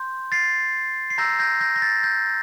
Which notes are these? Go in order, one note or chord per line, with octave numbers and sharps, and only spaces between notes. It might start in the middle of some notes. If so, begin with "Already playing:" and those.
Already playing: C6 G6
A6 C7
C7
A#5 E6 G6 A#6
G6 A#6
G6 A#6
A#6
A6
G6